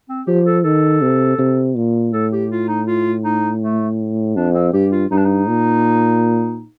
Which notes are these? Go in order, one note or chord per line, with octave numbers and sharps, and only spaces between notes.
C4
F3 G4
A4
D#3 A4
C3
C3
A#2
A2 A4
G4
F4
D#4
F4
D#4
A3
F2 D4
C4
G2 G4
F4
G2 D#4
D4
D#4
A#2